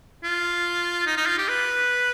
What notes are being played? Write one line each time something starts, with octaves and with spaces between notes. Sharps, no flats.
F4
D#4
D#4
F4
G4
B4